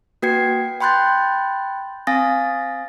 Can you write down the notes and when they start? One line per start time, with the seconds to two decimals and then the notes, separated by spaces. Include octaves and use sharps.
0.22 A#3 F#4 B4 G5 G#6 C7
0.81 G5 B5 C6 F#6 G6 A6
2.07 C4 F5 G#5 D#6 A6 A#6